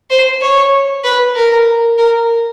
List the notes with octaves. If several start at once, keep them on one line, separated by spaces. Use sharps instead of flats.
C5
C#5
B4
A#4
A#4